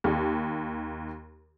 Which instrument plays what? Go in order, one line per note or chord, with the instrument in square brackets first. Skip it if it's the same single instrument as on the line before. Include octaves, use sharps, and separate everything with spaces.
[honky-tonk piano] D#2